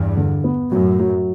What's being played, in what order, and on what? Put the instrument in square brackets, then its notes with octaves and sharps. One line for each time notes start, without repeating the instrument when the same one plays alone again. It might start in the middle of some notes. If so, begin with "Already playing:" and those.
Already playing: [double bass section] E2 G2
[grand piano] D3
B3
[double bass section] F#2 A2 [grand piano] F#3
[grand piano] F#3